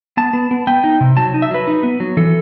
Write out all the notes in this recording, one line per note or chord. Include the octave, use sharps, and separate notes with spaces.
B3 A5
B3
B3
B3 G5
D#4
C3
F#3 A5
D#4
E5
F#3 B4
D#4
B3
F#3
E3 A4